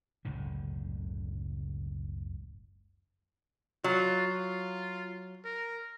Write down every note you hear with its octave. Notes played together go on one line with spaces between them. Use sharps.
F#1 C#2 A2 D3
F#3 F4
F4
A#4